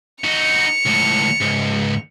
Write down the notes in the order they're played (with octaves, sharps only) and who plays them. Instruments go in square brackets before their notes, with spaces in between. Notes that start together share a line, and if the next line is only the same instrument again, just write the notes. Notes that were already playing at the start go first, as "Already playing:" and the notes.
[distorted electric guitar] D#4 F#4 [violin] C#7 F7
[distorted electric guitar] C#2 A2
C#2 G#2